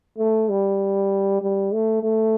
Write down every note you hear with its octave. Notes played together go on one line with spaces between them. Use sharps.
A3
G3
G3
A3
A3